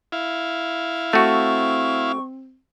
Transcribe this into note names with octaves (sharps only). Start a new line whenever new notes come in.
E4 F5
A3 C4 F#4 C#6